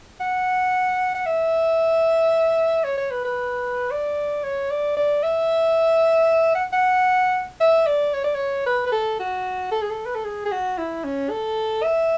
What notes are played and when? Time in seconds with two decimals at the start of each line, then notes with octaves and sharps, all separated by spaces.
0.20 F#5
1.15 F#5
1.26 E5
2.84 C#5
2.98 C#5
3.11 B4
3.25 B4
3.91 D5
4.44 C#5
4.71 D5
4.97 D5
5.23 E5
6.55 F#5
6.73 F#5
7.61 E5
7.87 D5
8.14 C#5
8.24 D5
8.35 C#5
8.66 B4
8.87 B4
8.93 A4
9.20 F#4
9.72 A4
9.82 G#4
9.91 A4
10.06 B4
10.15 A4
10.25 G#4
10.46 G#4
10.52 F#4
10.78 E4
11.05 C#4
11.30 A4
11.84 E5